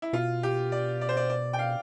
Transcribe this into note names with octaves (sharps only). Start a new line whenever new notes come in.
E4
B2 F4
G4
D5
D5
C5
D5
D5
G5
F5